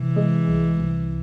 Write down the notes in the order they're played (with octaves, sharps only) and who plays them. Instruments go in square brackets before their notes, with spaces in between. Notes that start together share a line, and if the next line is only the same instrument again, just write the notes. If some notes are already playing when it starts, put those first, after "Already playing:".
Already playing: [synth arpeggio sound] C3 [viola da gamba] E3
[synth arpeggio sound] G#3
C2
C2